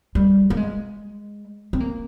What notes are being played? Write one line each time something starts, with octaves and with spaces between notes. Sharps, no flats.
G3
A#3
G#3
C4
A#3